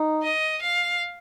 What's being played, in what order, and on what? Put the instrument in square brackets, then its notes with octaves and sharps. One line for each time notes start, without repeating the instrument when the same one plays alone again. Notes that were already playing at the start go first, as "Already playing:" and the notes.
Already playing: [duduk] D#4
[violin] D#5
F5